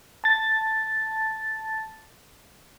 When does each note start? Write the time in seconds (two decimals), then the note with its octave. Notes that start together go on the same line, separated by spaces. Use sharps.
0.24 A5 A6